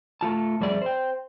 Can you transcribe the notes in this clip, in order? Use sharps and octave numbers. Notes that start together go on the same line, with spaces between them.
A3 F4 A5
F2 G3 G#4 D5 E5
C5 G5